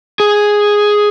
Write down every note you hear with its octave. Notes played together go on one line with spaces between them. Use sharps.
G#4